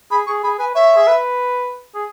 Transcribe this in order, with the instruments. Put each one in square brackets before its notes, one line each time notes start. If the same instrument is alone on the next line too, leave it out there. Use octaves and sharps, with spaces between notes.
[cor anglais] G#4 [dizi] B5
[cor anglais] G#4 [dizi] C#6
[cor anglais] G#4 [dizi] B5
[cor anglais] B4 [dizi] G#5
[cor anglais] C#5 [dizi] E5
[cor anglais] G#4
B4
G#4